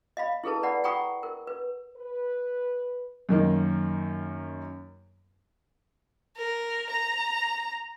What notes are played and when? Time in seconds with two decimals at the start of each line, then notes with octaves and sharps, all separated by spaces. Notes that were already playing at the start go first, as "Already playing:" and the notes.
0.17 D#5 F5 B5
0.44 E4 G#4 A4 B4 A5
0.63 B4 D5 F#5 B5
0.84 F#5 G5 A#5 B5 C#6 D#6
1.23 A#4
1.47 B4
1.97 B4
3.29 F#2 D#3 A#3
6.37 A#4
6.91 A#5